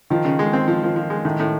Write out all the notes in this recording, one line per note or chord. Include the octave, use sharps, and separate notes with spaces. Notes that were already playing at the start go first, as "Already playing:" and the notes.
D#3 F3
C#3
G#3
C4
F3
F3
F3
G#3
A2 D#3
A2